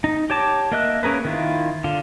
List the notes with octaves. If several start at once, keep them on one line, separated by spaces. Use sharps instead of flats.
D#4
G4 C#5 A5 D6
A#3 A#4 D#5 E5 F#6
A#3 C#4 G#4 A#4 B4
D#3 E4 F4
D3 F4